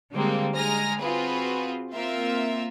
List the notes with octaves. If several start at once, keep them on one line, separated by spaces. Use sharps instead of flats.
D3 G3 G#3 A#3 C4
G#3 G#5 A#5 F6 A#6
C4 F4 F#4 G#4 B4
A#3 C4 F4 A#4 E5